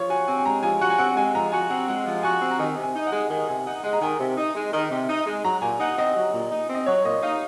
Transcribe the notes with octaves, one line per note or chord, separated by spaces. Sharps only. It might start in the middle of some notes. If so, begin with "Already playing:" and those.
Already playing: F3 C#5
F#4 G#5
C4 G#5
G#5
G#3 A#5
F3 G#5
F#4 F#5
G#5
C4 F#5
G#3 G#5
F3 A#5
F#4 G#5
C4 F#5
G#3 F#5
F3
F#4 G#5
C4
A#5
D#3 G#5
C3
G#5
D#4
F#5
G#3
D#3 G#5
C3 G#5
D#4 F#5
G#3 F#5
A#5
D#3 G#5
C3
D#4
G#3
D#3
C3
D#4
G#3
F#3 A#5
A#2 G#5
D#4 F#5
C4 D#5
F#3
A#2
D#4
C4
D#5
F#3 C#5
A#2 D#5
D#4 F5